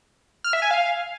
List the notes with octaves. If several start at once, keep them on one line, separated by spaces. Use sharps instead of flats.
F6
E5
G#5
F5